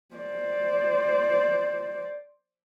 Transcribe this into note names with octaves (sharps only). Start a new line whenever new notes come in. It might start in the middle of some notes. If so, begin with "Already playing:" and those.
C5 D5